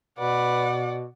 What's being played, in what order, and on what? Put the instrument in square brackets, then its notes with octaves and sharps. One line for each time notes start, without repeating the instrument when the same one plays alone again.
[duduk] B2 [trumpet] B4 [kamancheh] D5 F#5